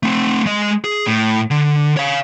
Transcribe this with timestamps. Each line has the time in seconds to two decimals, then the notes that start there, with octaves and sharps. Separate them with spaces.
0.03 A3 C4
0.46 G#3 D#5
0.84 G#4
1.07 A2
1.51 D3
1.97 C#5 F5